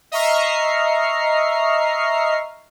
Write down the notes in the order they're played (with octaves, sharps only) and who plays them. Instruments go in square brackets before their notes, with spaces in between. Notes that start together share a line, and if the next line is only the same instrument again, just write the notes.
[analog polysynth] D#5 E5 A#5 C#6 F6 C7